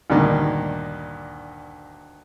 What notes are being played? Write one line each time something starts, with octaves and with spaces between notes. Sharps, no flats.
D2 G2 A#2 D#3